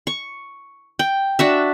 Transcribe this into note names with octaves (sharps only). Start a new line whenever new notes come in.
C#6
G5
D4 F#4 E5